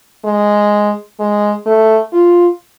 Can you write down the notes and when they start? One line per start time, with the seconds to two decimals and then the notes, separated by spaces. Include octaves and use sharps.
0.24 G#3
1.19 G#3
1.66 A3
2.13 F4